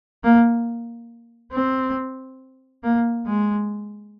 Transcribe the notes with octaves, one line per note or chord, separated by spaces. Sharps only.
A#3
C4
A#3
G#3